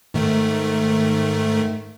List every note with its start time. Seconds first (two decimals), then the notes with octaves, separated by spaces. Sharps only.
0.14 G#2 D#3 A3